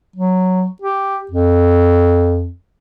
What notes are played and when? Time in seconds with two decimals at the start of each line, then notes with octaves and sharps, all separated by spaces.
0.16 F#3
0.82 G4
1.31 F2